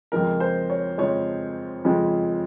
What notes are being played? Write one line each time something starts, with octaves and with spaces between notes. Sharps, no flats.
F2 C#3 F3 G#3 A#4
C5
C#5
F2 C#3 F3 G#3 C#5
F2 C#3 F3 G#3